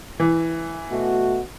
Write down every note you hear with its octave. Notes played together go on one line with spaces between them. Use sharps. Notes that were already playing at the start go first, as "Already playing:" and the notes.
E3
B2 A3 F#4